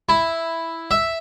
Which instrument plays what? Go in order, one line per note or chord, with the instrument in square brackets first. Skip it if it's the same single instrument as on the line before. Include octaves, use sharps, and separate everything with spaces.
[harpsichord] E4
E5